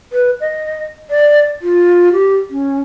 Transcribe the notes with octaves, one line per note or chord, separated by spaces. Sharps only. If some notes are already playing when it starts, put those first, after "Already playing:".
B4
D#5
D5
F4
G4
C#4